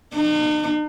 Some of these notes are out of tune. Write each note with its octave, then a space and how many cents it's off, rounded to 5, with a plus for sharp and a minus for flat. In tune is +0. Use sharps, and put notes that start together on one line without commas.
D#4 -45